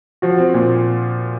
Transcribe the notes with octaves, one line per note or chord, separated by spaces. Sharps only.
F3 F#4
C4
A#2